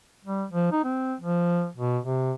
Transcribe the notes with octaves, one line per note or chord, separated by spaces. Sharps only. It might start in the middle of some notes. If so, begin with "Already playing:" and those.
G3
F3
D#4
C4
F3
B2
C3